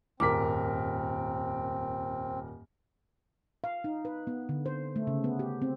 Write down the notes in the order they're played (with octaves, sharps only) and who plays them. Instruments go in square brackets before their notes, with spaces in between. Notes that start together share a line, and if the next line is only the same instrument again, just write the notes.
[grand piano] D#1 A#4 B6 [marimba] F2 G#2 D6 [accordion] C4
[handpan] F5
D#4
B4
B3
D3
C5
A3
C#3
B3
G4
C4